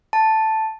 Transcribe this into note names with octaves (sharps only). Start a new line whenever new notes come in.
A5